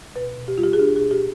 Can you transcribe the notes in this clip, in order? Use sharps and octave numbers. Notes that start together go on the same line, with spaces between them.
B2 B4
B2
G4
G3 F4
G4
G#4
D4 G4
B2 G#4
G4